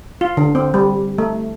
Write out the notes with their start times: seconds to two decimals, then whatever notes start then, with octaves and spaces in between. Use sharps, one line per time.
0.21 F4
0.37 D3
0.55 C4
0.74 G3
1.18 A3